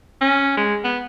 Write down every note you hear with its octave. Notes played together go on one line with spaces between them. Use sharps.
C#4
G#3
B3